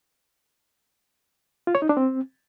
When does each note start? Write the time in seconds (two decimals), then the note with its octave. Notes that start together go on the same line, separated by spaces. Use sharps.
1.67 F4
1.75 C#5
1.82 D#4
1.89 D4
1.97 C4